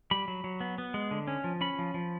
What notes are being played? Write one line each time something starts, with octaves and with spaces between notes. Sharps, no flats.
G3 B5
F#3
F#3
B3
B3
G#3
D3
C#4
F3
C#4 B5
F3
F3